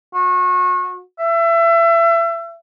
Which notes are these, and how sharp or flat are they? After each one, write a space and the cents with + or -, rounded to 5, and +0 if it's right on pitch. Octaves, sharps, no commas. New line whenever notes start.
F#4 -30
E5 +30